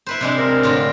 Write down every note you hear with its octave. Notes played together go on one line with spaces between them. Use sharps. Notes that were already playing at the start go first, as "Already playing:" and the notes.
E4 B4 C5
C3 G#3 D4
C4 A#4
A2 D3 F4